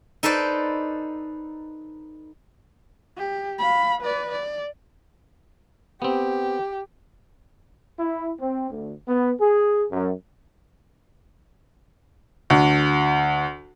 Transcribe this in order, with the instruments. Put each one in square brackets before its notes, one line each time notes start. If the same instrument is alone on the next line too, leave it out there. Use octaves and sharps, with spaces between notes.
[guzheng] D#4 A4 B4 C5 D5
[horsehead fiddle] G4
F5 B5
B4 D5
D5
[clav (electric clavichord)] B3 C4 [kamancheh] G4
[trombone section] E4
C4
D2
B3
G#4
F#2
[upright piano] D2